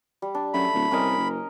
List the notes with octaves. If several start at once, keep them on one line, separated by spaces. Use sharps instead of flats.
G3
D4
F#2 A3 B5
D1
C2 C#4 A#4 D#5
F#1